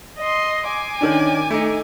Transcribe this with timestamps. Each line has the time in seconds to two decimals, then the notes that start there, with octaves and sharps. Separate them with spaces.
0.19 D#5 C6
0.68 G#5 D6
1.01 D#3 C#4 D4
1.50 A3 D#4